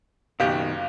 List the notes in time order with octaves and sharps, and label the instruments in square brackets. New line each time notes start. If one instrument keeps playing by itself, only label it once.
[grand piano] F#1 F#2 G4 [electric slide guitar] B2 D#3 [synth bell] F5